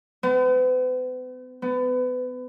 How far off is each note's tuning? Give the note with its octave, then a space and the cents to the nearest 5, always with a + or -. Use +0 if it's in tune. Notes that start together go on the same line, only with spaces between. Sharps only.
B3 +45
B3 +30